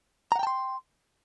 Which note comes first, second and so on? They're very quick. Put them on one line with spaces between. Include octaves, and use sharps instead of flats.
A#5 F#5 G5 A5 C6